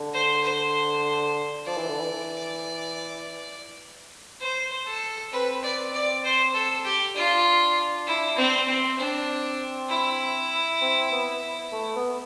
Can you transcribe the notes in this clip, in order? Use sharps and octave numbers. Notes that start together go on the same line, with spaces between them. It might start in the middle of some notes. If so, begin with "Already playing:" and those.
Already playing: D3
C5
C5
F3 D5
E3
D3
E3
C5
A4
C4 B4
D5
D5
C5
A4
G4
D4 F4
E4
C4
C4
C4 D4
E4
C4
B3
A3
B3